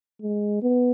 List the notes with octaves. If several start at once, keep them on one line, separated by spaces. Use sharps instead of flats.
G#3
B3